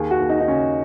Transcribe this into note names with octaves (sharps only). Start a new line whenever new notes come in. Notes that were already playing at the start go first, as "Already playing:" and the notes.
Already playing: D#2 G#4
F#4
D#2
D#4
D#4
C#3 C#4